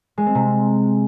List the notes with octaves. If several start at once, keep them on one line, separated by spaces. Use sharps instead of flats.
G#3
C4
C3